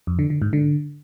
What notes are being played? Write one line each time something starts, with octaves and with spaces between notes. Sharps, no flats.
F2
D3
D3
G#2
D3